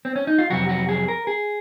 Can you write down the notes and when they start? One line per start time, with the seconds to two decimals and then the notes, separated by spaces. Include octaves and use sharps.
0.05 C4
0.16 C#4
0.27 D#4
0.38 F4
0.50 F2 C3 F#3 F#4
0.69 F#4
0.89 G#4
1.08 A#4
1.27 G#4